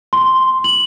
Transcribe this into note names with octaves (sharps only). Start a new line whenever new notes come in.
C6
F#7